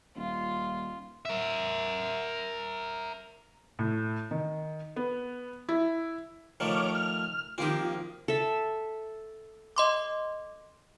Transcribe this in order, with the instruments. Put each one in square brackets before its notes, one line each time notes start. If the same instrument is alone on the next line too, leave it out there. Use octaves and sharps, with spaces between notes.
[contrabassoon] D#1 [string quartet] F4
[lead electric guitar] A#4 E5
[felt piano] A2
D#3
B3
E4
[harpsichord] D#3 F3 A3 [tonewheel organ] C#5 D6 F6
[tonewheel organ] F6
[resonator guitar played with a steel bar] D#3 F3 A#3 [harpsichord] C4 G4 [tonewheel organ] F4
[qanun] A4 E5
[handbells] D#5 C6 D6